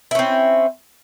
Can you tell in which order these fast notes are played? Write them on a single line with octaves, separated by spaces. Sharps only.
E4 C#4 C4